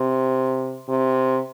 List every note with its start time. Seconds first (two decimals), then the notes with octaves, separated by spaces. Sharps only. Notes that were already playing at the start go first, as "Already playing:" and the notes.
Already playing: C3
0.89 C3